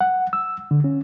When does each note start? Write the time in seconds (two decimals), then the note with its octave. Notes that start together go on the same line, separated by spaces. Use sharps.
0.01 F#5
0.33 E6
0.71 D3
0.84 C#4